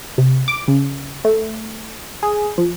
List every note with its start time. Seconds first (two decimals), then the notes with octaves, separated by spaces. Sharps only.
0.18 C3
0.48 D6
0.68 C#3
1.25 A3
2.23 G#4
2.58 F3